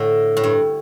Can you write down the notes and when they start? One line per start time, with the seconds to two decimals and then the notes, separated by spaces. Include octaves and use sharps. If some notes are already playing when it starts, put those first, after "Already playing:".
Already playing: A2 D3
0.37 A2
0.44 G2